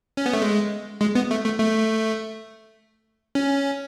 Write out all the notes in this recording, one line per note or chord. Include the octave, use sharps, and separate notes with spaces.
C#4
B3
A3
G#3
G#3
B3
A3
A3
A3
C#4